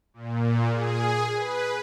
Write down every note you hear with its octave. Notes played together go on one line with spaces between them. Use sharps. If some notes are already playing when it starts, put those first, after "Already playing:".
A#2
G#4
B4